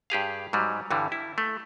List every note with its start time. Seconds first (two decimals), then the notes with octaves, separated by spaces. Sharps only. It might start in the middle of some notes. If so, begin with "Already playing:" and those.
0.10 G2 G4 G#4 F5
0.53 G#2 F#3 G3
0.91 G2 D3 E3 G3
1.12 E4
1.38 A3